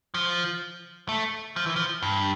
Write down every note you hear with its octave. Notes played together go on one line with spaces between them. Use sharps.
F3
A3
F3
E3
F3
G2